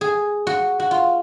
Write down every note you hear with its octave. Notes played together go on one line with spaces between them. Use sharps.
G#4
F#4
F#4
F4